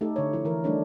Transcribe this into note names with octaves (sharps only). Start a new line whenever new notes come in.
A3 D#4 G4 A4
D3 C#5
F3 E4
E3 A#4
G3 A3 D4 D#4 C#5